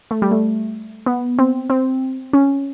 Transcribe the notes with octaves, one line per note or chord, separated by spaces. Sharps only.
A3
G3
A3
B3
C4
C4
C#4